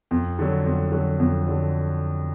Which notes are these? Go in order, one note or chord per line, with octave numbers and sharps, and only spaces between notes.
F2
D3 F#3
F2
D3 F#3
F2
D3 F#3